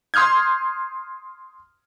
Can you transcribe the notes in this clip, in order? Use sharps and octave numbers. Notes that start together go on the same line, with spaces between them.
C6 D#6 F6 G6 G#6